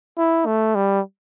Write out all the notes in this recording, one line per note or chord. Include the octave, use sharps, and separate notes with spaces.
E4
A3
G3